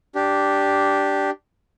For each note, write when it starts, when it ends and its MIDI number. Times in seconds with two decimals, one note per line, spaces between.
0.15 1.30 62
0.15 1.30 67